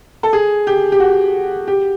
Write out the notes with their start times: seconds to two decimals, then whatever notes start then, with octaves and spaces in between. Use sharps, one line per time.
0.23 A4
0.33 G#4
0.67 G4
0.92 G4
1.00 F#4
1.68 G4